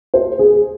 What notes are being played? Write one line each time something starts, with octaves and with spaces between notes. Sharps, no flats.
C5
G#4